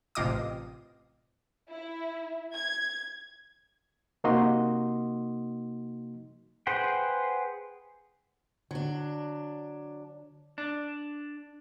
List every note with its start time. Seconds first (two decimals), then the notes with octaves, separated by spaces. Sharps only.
0.15 A1 C3 F4 D#5 D6 D#6
1.70 E4
2.52 G#6
4.24 C3 A#3 D#4 F#4 D#5 C6
6.67 G#4 B4 C5 F#5 G5
8.71 D3 F#3 D4
10.58 D4